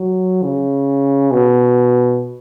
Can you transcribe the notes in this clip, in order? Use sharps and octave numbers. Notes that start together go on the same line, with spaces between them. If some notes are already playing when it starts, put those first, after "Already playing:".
Already playing: F#3
C#3
B2